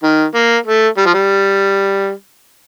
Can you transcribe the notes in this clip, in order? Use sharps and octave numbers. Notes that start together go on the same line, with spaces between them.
D#3
A#3
A3
G3
F3
G3